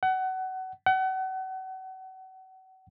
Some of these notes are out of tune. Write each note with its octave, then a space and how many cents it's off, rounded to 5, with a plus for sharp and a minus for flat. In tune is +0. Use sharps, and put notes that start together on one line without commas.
F#5 +25
F#5 +35